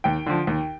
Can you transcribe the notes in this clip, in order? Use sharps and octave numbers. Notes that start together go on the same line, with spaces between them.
D#2 G5
D3 F3
D#2